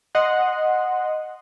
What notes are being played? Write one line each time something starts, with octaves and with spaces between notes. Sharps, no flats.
D#5 F#5 C6